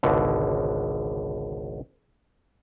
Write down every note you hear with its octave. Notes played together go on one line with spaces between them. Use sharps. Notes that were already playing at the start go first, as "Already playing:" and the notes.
G#1 C#2 B2 D3